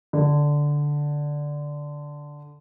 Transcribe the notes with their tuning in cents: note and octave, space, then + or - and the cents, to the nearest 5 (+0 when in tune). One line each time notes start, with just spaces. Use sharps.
D3 -5